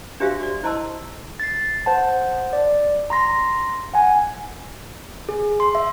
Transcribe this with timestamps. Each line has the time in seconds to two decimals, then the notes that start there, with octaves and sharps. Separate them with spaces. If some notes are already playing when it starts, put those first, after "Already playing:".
0.20 D4 F#4 G4 C5 E5 F5
0.40 F#4 D5
0.63 E4 C5 D#5 A5 C6 E6
1.40 A6 C7
1.86 C5 F#5 A5
2.53 D5
3.10 A#5 C6 A#6
3.93 F#5 G#5
5.29 G#4
5.60 C6
5.75 E5